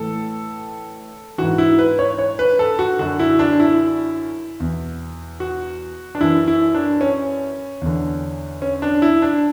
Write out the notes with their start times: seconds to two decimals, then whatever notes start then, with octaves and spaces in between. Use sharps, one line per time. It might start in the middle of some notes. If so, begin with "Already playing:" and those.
Already playing: A2 E3 A4
1.38 G#2 E3 F#4
1.58 E4
1.79 B4
1.99 C#5
2.19 C#5
2.39 B4
2.59 A4
2.79 F#4
2.99 F#2 D3 F#4
3.19 E4
3.39 D4
3.60 E4
4.60 E2 B2
5.40 F#4
6.15 D4
6.21 F#2 E3 E4
6.48 E4
6.74 D4
7.01 C#4
7.82 E2 D3
8.62 C#4
8.82 D4
9.02 E4
9.22 D4